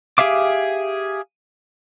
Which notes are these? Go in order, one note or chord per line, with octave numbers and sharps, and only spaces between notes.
G4 G#4 E5 F5 D6